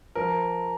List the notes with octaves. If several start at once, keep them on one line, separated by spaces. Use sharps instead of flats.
F3 A#4